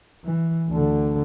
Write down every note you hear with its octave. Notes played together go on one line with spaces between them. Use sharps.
E3
D2 D3